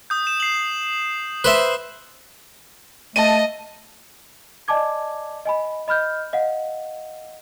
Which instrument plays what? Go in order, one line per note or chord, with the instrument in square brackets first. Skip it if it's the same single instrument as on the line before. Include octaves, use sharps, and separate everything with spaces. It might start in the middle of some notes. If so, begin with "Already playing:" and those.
[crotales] D#6 G6
E7
C7 F#7
[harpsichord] B4 C5 E5
[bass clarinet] A3 [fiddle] D#5 [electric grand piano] A5 D#7
[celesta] D5 D#5 G#5 A5 D6 G#6
D#5 G#5 B5
D#5 B5 F6 G6
D#5 F5 F#5